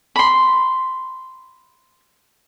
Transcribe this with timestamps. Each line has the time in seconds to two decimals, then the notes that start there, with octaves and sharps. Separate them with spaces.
0.16 B5 C6